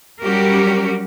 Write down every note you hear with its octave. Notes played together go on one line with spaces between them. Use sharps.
F#3 G3 C#4 F#4 G4 A#4